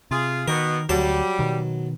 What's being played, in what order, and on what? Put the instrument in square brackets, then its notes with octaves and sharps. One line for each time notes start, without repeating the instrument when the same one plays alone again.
[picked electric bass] C3 [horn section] F4 G#4
[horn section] B2 B3 [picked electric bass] D#3 [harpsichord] A#4
[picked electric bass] D2 [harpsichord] F#3 A5 [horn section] G3
[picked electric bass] B2 D#3